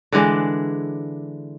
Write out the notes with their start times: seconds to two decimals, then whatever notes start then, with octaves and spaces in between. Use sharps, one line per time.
0.12 D3 E3 G#3 D4